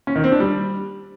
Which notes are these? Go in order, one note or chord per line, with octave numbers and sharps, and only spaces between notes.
C#4
D#3
C4
D4
G3